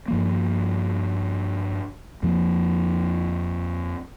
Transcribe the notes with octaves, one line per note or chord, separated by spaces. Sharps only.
G2 F3 A#3
F2 F3 A#3